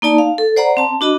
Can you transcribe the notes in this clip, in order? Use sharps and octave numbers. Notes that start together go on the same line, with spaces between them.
A#3 D#4 D5 A5
F5
A4
C5 D5 F#5 A#5 B5
C4 A5
D4 F#4 D#5 B5